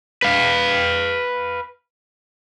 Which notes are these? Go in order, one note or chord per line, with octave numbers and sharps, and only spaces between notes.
B4 F5